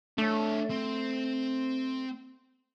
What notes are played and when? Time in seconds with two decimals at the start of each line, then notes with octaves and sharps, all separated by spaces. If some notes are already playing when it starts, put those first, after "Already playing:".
0.18 A3 D4 C#5
0.70 C4